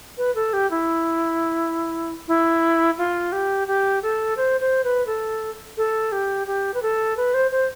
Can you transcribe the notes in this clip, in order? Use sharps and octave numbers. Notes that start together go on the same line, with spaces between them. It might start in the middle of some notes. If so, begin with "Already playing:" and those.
B4
A4
G4
E4
E4
F4
G4
G4
A4
C5
C5
B4
A4
A4
G4
G4
B4
A4
B4
C5
C5